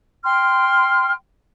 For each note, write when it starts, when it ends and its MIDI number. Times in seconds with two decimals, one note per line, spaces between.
0.25 1.12 79
0.25 1.12 84
0.25 1.12 89